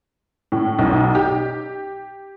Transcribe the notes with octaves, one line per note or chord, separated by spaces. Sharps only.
A2
B1
G4